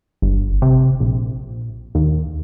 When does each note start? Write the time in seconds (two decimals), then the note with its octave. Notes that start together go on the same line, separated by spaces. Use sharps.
0.22 G1
0.62 C3
1.00 A#1
1.95 D#2